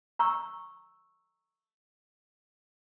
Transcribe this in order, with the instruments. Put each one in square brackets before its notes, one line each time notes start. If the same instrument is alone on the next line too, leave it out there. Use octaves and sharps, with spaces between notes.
[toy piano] A#5 C#6 E6